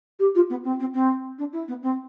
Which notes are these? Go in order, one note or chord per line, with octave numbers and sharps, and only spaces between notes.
G4
F4
B3
C4
C4
C4
D4
E4
B3
C4